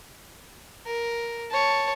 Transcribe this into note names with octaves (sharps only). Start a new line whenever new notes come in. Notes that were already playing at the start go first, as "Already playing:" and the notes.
A#4
C#5 A5